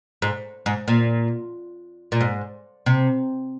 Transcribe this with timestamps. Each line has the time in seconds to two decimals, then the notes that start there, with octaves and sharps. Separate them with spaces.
0.22 G#2
0.66 G#2
0.88 A#2
2.12 A#2
2.21 G#2
2.86 C3